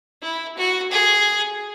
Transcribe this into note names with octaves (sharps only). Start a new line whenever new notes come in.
E4
F#4
G#4